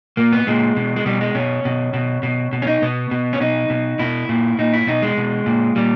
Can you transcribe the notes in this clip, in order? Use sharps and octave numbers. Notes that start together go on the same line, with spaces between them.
A#2 A#3
B3
A#2 G#3
B2
G#3
B2 G3
G#3
B2 C#4
B2
B2
B2
B2
C#4
D#4
B2 B3
B2
C#4
B2 D#4
B2
B2 E4
A#2
A#2 D#4
E4
B2 D#4
G#3
B2
A#2
A#2 G3